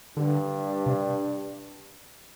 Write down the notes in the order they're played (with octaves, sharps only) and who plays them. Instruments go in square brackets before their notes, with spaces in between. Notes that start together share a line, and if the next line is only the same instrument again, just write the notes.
[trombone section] G2 [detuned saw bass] D3
[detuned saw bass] C3